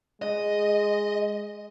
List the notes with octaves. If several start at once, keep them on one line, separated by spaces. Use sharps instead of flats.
G#3 D#5